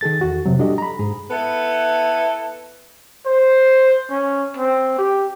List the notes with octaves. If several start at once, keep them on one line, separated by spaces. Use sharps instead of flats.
D#3 G#4 A4 A6
E2 F#4
F2 C3 F#3
G3 D4 F#4 G4 A4 D#5
A#5 B5
G#2 G#4
B3 E4 A4 B4
C5
C#4
C4
G4